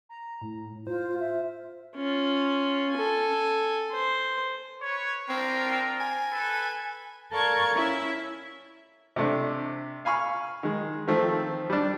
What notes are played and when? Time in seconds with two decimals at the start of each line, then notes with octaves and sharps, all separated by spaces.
0.09 A#5
0.41 A2
0.72 A2
0.87 F4 C5
1.20 E5
1.96 C#4 F4
2.92 A4 G#5
3.92 C5
4.82 B4 C#5
5.29 C4 D4 F4 A#4
6.00 G#5
6.31 A4 B4
7.31 A4 A#4 D5 F5 C#6 G#6
7.74 C#4 E4 E5
9.16 C3 A3 D4
10.05 F5 G#5 B5 C#6 F6
10.63 D#3 G#3
11.08 D#3 F3 A3 C4
11.70 G3 D4